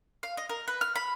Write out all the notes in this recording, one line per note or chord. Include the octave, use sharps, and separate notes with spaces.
F5
D#5
A#4
B4
F6
B5